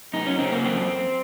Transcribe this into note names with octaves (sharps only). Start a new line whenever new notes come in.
F#2 D#4
C#4
C#3 C4
A#3
F#2 C4